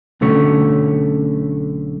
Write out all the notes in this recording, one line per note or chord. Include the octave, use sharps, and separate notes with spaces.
B1 D3 A3 C#4 C#5